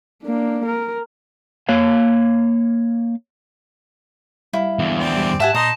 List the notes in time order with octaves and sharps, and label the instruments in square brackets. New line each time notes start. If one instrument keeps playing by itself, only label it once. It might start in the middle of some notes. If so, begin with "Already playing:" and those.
[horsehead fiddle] A#3 D4
A#4
[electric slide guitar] A#3 C#5 F5
[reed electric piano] G3 F5 [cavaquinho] E4
[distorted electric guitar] E2 D3
[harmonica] C4 D5
[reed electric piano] G3
[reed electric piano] G#2 G4 [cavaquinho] E5 F#5 G#5 [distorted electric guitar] A5
[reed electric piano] A#2 [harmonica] D#4 A#5 C6 [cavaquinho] D#6